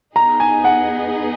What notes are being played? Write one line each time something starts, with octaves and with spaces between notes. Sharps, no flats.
B3 D#4 G#4 D#5 A#5
G#5
F#5